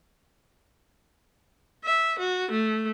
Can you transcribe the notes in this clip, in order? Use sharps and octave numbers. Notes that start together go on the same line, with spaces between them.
E5
F#4
A3